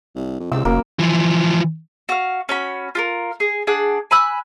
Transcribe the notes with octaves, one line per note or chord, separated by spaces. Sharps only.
C2
F2
C#2 C3 E6
F1 F#2 A#3
E3 F3
F#4 F5
C#4 F#4 B5
F4 G4 A#4
G#4
D4 G#4 F#5 F#6
G#5 B5 E6 F#6